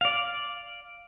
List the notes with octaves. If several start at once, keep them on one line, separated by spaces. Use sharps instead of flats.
D5 F5